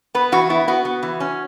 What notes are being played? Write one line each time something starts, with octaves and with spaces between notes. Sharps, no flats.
B3 B4
E3 F#4
B3 E4
B3 F#4
B3
E3
C#4